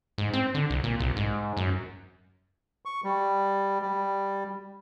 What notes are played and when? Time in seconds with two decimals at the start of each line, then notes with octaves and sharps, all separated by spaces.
0.18 G#2
0.33 C4
0.54 D3
0.70 C2
0.84 A#2
0.99 C2
1.17 G#2
1.57 F#2
2.85 C#6
3.04 G3
3.82 G3